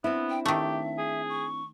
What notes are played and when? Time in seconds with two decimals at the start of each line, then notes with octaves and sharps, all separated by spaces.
0.04 B3 C4 D4 E4
0.30 G5
0.46 D#3 A3 G4 E5
0.98 G#4
1.29 C#6